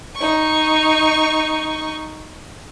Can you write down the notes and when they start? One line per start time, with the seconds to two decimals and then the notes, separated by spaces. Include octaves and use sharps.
0.16 D#4 C#6